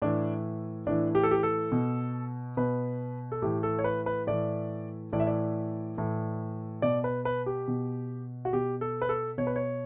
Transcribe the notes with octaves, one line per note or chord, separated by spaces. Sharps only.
A2 E3 D4
A2 E3 D4
G4
A4
G4
A4
B2
B2 B4
A4
A2 E3 G4
A4
C#5
B4
B4
A2 E3 D5
A2 E3 D5
E5
D5
A2 E3
B2 D5
B4
B4
G4
B2
F#4
B2 G4
A4
B4
A4
B2 C#5
B4
C#5